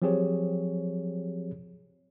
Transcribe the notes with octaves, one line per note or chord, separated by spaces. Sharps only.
F3 F#3 C4 G4 G#4 C#5